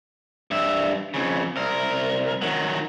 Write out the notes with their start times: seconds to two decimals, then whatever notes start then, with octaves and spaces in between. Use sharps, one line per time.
0.51 G2 E5
1.14 F2 C#3
1.56 C2 A#4
2.42 D#3 F#3